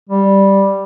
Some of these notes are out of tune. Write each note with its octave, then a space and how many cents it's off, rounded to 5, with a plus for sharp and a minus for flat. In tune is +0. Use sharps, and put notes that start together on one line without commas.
G3 +0